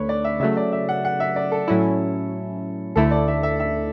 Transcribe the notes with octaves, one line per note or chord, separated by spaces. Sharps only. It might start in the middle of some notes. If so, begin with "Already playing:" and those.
Already playing: D2 D3 A3 B4 C#5
D5
E5
C#3 F#3 A3 E5
D5
E5
F#5
F#5
E5
D5
A4
A2 F#3 C#4 E4
D2 D3 A3 E4 A4
D5
E5
E5
E5